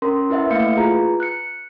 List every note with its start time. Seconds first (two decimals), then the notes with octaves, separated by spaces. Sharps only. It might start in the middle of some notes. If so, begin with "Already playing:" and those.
0.02 C#4 A#4 C6
0.30 E4 B4 D#5 E5 F#5
0.50 A3 A#3 E4 F5 C#7
0.77 F4 G#4 B4 A#5
1.20 F#6 C#7